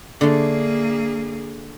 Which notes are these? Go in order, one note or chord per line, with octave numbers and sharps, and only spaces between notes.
D3 A3 A#3 G#4